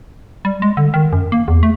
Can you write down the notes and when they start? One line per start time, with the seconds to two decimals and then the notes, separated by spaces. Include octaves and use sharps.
0.45 G3
0.62 G#3
0.77 D3
0.94 D#3
1.13 F#2
1.32 A#3
1.48 E2
1.63 A3